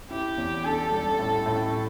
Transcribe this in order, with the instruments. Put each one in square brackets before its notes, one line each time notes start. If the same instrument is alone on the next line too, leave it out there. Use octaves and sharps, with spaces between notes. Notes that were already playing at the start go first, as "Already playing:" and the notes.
[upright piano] E4 [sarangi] G4
[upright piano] E2
[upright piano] D4 [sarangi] A4
[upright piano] G3
A2
A2